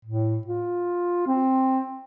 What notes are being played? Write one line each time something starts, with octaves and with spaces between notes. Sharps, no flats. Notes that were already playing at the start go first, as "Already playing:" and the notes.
A2
F4
C4